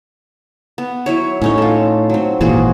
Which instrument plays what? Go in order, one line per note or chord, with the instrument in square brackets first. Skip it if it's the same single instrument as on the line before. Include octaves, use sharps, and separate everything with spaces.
[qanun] B3
F#3 E4 C#5
[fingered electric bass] A2 [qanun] C#4 D#4 C#5
[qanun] F4 A4
F#3 C4
[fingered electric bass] G#1 A#2 E3 [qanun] F4 F#4 G#4